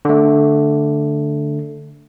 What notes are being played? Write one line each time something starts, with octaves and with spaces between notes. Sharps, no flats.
D3 A3